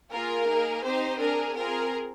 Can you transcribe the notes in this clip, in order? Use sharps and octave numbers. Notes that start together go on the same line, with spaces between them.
A#3 F4 G#4 A#4
A#3 D#4 G#4
C4 D#4 G4 C5
D4 G#4 A#4
C4 F4 G#4 A#4